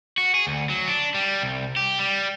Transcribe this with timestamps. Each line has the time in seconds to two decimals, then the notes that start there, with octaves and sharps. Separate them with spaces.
0.18 F#4
0.34 G#4
0.47 D2
0.70 F#3
0.88 D4
1.14 G3
1.42 C2
1.76 G4
1.99 G3